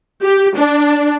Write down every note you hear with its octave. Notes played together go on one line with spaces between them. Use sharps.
G4
D4